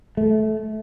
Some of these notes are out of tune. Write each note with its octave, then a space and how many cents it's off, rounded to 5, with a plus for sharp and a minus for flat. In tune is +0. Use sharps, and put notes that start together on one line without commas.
A3 -20